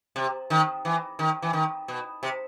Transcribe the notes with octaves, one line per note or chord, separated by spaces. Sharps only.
C3
D#3
E3
D#3
E3
D#3
B2
C3